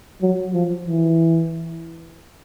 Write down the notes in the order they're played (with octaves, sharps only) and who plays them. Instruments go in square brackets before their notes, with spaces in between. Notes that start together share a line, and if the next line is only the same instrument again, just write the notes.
[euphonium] F#3
F3
E3